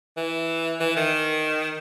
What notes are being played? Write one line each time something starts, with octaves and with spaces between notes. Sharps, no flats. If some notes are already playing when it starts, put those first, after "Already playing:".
E3
E3
D#3